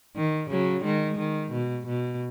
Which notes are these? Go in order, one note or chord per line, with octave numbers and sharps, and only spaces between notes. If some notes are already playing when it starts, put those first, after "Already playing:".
D#3
C#3 F#3
D#3 G#3
D#3
B2
B2